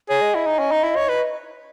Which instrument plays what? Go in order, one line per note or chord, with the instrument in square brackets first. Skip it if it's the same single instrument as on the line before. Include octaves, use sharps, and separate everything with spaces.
[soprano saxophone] G#4 [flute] C#5
[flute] D#5
[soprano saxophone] E4
D#4
C#4
D#4
E4
C#5
B4